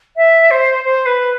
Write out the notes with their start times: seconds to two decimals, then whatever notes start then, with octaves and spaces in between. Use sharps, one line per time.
0.17 E5
0.51 C5
0.84 C5
1.06 B4